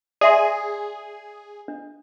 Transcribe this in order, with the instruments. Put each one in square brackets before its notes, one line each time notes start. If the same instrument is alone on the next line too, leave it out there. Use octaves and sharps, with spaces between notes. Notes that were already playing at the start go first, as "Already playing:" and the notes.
[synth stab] G#4 [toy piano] D5 E5 C6
[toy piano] D4